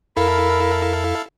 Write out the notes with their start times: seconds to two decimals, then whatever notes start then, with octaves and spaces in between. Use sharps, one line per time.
0.17 F2 E4 A4 A#4 F5 B5